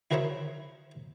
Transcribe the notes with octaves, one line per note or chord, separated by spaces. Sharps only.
E4 F#4 A#4 C5 C#5 E5